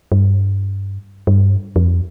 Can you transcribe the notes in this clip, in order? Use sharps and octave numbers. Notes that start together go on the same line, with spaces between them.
G2
G2
F2